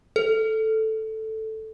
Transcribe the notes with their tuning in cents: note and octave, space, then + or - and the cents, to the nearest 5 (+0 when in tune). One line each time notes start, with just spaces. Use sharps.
A4 +0